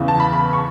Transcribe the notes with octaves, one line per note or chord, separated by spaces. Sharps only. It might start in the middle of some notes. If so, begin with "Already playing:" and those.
Already playing: E2 C#3 E3
A5
B5
B5
C#6